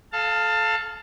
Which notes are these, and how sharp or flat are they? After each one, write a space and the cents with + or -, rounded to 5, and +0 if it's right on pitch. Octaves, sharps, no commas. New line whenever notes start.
A4 -25 F5 +0 A5 +20